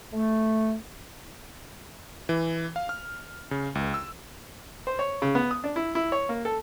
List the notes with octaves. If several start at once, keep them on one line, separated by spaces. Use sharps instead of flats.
A3
E3
F5
F6
C#3
C#2
E6
C5
C#5
C#3
B3
D#6
D4
E4
E4
C#5
A#3
A4